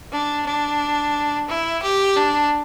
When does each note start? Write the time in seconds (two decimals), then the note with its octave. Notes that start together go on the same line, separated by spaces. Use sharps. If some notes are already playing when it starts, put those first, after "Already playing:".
0.12 D4
0.47 D4
1.49 E4
1.83 G4
2.17 D4